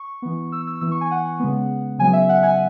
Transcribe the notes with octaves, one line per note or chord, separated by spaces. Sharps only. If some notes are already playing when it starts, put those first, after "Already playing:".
Already playing: C#6
E3 B3
E6
E6
E3 B3 E6
C#6
G#5
F#5
C#3 G#3 B3
C#3 F#3 B3 G#5
E5
F#5
G#5